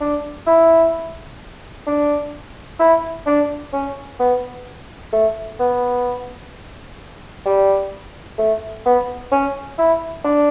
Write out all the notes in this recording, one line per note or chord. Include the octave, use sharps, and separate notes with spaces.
D4
E4
D4
E4
D4
C#4
B3
A3
B3
G3
A3
B3
C#4
E4
D4